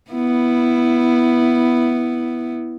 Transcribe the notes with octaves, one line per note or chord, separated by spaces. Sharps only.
B3 E4